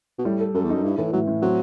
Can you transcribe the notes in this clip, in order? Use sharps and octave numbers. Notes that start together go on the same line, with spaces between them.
B2
A2 G3
A4
F#2 A4
E2
F#2 D#4
G2 E4
A2 E3
A2 F#3
A2
F#3 C4